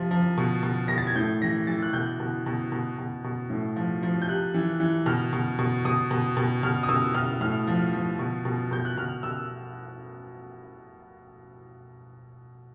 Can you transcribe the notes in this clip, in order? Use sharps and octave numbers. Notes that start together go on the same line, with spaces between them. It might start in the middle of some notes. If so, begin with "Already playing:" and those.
Already playing: C3 F3
F3
B2
B2
B2 A#6
A6
G#6
A2 G6
E3 A#6
E3 A6
F#6
B2 G6
B2
B2
B2
B2
B2
A2
F3
F3
G6
C3 F#6
E3
E3
B2 F6
B2
B2
B2 D#6
B2
B2
B2 F6
D#6
B2 E6
B2 F6
A2 F6
F3
F3
B2
B2
B2 G6
F#6
B2 F6
B2 E6